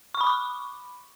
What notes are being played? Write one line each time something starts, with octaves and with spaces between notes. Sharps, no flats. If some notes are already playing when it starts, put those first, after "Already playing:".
C#6
B5
D6